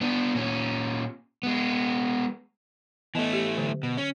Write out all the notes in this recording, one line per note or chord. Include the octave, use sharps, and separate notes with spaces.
B3 D4
A#2 C#4
G#3 B3
E3 A3 B3 D#5
G4
D3 F#3
B2
C#4